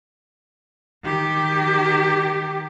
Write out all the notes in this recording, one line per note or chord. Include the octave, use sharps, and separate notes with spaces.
D#3 G4